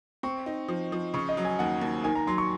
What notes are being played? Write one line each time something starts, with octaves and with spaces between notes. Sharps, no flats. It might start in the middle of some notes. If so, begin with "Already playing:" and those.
C4 C#6
D#4
F3
F3
C#3 C#6
D#5
F#3
G#5
D#2 F#5
D#2
D#3 G#5
A#5
F#3 C6
C#6